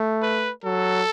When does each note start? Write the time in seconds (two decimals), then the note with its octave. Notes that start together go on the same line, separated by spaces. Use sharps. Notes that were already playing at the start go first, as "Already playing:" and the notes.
Already playing: A3
0.22 B4
0.64 F#3 A4